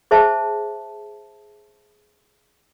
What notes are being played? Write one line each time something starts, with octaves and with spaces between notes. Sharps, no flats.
G#4 C5 E5 A5